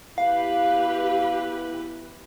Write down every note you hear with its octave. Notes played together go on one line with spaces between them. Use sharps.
E3 B3 E4 G4 B4 F5